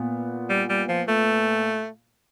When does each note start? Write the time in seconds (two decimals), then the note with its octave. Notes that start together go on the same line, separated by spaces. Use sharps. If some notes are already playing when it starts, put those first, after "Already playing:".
Already playing: A#2 B3
0.50 G3
0.69 G3
0.89 F3
1.08 A3